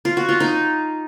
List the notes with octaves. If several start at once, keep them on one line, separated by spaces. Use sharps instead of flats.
F4
F#4
F4
D#4